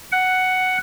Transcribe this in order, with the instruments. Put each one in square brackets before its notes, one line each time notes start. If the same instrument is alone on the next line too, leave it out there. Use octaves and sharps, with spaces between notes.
[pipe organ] F#5